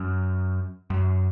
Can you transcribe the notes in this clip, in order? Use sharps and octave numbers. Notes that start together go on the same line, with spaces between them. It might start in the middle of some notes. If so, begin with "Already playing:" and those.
Already playing: F#2
F#2